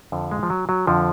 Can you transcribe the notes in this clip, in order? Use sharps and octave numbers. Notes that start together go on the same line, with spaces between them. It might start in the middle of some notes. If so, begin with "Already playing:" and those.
F2 D3 F3
G#3
F3
F#3
F#3
F2 D3 F3